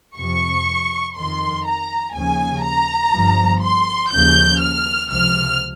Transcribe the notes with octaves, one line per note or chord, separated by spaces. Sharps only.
F2 C3 F3 C#6
F2 D#3 C6
A#5
D#2 C#3 F3 G#5
A#5
G1 G2 F3
C6
D#2 C#3 F3 G6
F6
C#2 C3 F3 F6